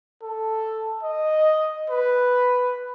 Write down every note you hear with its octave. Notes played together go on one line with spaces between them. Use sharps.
A4
D#5
B4